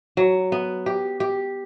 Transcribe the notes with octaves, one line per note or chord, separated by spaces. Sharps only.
F#3
B3
G4
G4